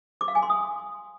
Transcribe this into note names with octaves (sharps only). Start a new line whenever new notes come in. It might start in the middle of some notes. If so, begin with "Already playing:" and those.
D6
F5
G#5
C6
D#6